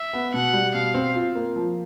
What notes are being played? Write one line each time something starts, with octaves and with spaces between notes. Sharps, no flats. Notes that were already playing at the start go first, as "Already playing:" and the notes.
Already playing: E5
B3
B2 F#5
G3
B2 F5
C4
F4
A#3
F3